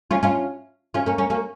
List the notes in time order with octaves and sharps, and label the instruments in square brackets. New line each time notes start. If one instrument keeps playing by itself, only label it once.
[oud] C#4 F4
C#4 F4
C#4 F4
A#3 C#4
A#3 C#4
A#3 C#4